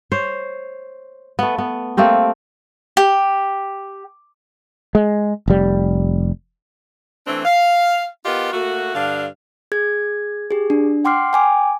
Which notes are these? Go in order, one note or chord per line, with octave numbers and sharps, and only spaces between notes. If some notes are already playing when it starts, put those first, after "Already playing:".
C5 C#5
A3 B3
B3
A3 A#3 C4 G4
G4
G#3
F1 G3
E3 A3 C4 D4
F5
B3 F4 G4 A#4 D#5
A3 A#3 F#4
G2 D3 D4 F5
G#4 G#6
G4 G#4
D4
F#5 G5 C6 D6 F6 C7
G5 G#5 D6